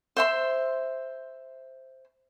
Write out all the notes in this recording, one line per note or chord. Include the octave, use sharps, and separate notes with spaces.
C5 E5 C6